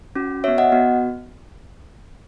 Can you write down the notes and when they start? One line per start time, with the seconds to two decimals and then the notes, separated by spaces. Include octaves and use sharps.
0.15 C#4 F#4
0.44 B3 F#4 C#5 E5
0.58 D#5 F#5
0.72 B3 F#4